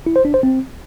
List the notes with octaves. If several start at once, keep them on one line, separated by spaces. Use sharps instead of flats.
E4
C5
D4
C5
C4